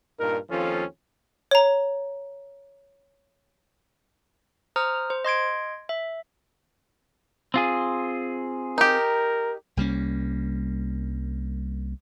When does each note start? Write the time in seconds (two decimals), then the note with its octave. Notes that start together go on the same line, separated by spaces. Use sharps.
0.19 G2 A#2 D#4 A#4
0.50 D#2 F3 C4 C#4 F4 A4
1.51 C#5 A#5
4.76 C5 A#5 D#6 F6
5.10 C5
5.25 D#5 C6 G#6 D7
5.89 E5
7.54 C4 F4 G#4
8.78 D#4 G4 A#4
9.77 C2 G3 A#3 C#4